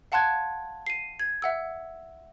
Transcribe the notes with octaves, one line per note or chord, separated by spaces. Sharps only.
F5 F#5 A5 C6 F#6 G#6
C7 D#7
G#6
E5 F#5 E6